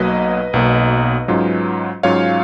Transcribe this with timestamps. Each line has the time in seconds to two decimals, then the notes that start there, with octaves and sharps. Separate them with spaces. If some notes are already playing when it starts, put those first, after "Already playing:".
Already playing: B1 B2 F#3 A#3 B4 D#5
0.54 B1 B2 F#3 A#3
1.28 G#2 F#3 C#4 F4
2.03 G#2 F#3 C#4 F4 C#5 F5